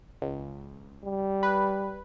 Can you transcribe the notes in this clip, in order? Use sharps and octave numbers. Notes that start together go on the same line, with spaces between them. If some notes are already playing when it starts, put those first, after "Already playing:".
C#2
G3
B4